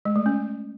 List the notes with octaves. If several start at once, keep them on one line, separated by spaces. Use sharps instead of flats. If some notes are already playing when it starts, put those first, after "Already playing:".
G#3
A3
C#4